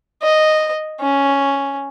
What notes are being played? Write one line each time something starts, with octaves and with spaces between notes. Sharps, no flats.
D#5
C#4